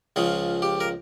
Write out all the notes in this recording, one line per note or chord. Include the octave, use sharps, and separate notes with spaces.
C#2 C#3 F3 G#4
G4
A#4